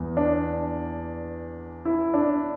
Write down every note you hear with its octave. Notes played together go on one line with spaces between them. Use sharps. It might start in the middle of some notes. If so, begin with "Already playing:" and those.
Already playing: E2 E3 B3
D4
E4
D4